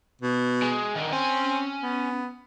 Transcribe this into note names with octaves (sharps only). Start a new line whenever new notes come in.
B2
G#3
D3 D#3
C4 C#4 G#5
B3